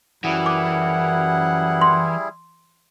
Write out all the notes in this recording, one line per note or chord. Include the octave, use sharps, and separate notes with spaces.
F#2 E3 G3 E4 G#4 F#5
D6
C6